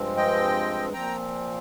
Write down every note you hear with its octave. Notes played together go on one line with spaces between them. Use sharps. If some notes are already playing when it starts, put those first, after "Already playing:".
Already playing: G2 F3 G#3 C4
D#5 G5
A#2 F3 C4 G5 A#5